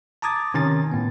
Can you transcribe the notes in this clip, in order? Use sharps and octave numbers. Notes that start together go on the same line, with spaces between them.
A5 A#5 D6 D#6 G#6 A6
C3 D#3 C#4 G#5 A6
A2 B3